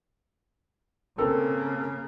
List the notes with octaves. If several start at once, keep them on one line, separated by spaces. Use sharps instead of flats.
C#3 A#3 C4 A4 A#4